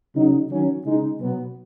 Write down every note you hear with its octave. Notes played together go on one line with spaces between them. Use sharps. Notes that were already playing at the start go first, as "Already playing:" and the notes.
C#3 F#3 D#4
D#3 F#3 C#4
C#3 G#3 D#4
B2 F#3 B3